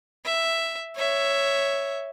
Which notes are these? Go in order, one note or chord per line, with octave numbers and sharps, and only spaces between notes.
E5
C#5 E5